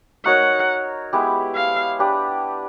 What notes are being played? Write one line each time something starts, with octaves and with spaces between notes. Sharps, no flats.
D#4 F#4 A#4 C#5 F#5
G#3 B3 E4 G4
F5
D4 G4 B4